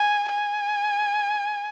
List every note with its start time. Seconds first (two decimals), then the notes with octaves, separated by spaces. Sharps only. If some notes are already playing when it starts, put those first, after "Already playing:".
Already playing: G#5
0.31 G#5